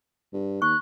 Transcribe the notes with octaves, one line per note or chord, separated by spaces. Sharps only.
G2
D#2 C#6 F#6